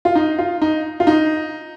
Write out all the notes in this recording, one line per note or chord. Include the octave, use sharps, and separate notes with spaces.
F4
D#4
F4
D#4
F4
D#4